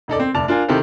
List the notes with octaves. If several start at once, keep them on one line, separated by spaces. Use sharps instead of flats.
E1 D#4 A4 D5
C4
F1 D5 A5 F7
D4 F4 A#4 G#5
C3 D#3 E4 G4 A4 C5